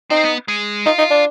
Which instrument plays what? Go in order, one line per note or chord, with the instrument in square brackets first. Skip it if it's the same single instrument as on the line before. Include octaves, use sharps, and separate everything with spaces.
[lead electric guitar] C4 [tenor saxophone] D#4
[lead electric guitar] B3
G#3
[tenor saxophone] D#4 [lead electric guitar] F4
[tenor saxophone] D#4
D4